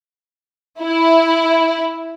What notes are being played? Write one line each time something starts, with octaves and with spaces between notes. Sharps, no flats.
E4